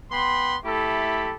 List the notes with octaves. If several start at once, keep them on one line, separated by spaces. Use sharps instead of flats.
B3 G5 B5 C6
A3 E4 G4 A4 B5